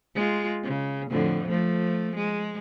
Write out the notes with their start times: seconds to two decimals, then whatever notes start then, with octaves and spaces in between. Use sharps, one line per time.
0.15 G#3 F4
0.64 C#3
1.10 F2 A2 D3
1.49 F3 A3
2.16 G#3